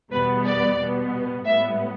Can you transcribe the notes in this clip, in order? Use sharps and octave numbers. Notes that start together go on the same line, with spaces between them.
E2 B2 G3 B3 B4
D5
B2 G3 B3
A2 G3 B3 E5